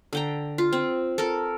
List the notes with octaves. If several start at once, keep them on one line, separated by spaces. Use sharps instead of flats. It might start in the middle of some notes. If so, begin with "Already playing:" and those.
D3 G5 A#5
F4
C4
A4 A#4